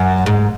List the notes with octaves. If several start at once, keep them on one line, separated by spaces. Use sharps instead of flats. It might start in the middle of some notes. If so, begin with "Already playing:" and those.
Already playing: F#2
G#2